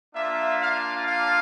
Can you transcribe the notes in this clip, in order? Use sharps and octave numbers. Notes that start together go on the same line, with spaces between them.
A#3 D4 F4 E5
F5
F5